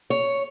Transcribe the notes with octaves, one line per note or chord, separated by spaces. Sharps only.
C#5